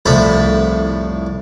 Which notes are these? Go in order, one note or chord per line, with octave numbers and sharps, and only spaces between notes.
C2 F2 A2 C5 A5 B5